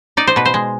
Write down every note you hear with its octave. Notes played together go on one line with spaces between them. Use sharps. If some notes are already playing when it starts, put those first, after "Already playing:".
D#4 D5
C5
B2 B4
C5
G#3